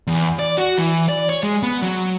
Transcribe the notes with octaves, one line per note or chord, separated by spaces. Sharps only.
E2
D5
F#4
E3
D5
C#5
G#3
B3
F#3